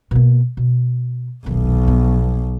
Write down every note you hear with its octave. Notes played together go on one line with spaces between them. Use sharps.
B2 A#3
B2
D#1 B1 D#3
F3 B3